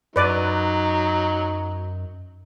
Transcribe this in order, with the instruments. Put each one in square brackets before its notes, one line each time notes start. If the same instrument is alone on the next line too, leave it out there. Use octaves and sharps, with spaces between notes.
[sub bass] F#2 [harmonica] F#3 [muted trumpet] D#4 [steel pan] B4 D5